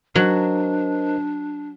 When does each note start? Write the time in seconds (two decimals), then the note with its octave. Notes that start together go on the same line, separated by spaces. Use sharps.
0.15 F#3 D4 A#4 C5 D#5